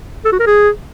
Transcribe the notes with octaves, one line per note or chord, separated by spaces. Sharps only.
A4
F#4
A#4
G#4